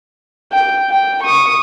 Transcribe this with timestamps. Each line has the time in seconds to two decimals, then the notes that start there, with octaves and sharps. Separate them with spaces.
0.52 G5
0.90 G5
1.24 C#6 D#6